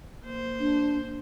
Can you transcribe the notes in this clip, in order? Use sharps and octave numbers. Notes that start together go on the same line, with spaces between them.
A#3 C5
D4